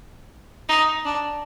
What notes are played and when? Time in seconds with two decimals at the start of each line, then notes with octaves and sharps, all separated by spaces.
0.69 D#4
1.05 D4